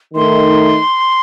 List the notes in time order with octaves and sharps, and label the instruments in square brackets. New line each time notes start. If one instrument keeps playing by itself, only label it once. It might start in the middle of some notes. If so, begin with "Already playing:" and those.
[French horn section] D#3 A3 D#4 [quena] C6